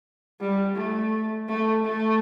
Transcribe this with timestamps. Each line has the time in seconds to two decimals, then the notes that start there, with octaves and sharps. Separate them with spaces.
0.40 G3
0.76 A3
1.48 A3
1.84 A3